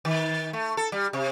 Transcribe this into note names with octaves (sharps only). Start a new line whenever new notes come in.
D#3
A3
A4
G3
C3